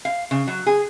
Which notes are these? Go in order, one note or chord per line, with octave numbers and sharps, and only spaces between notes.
F5
C#3
F#3
G#4